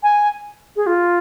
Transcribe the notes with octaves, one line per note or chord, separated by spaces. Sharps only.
G#5
G#4
F4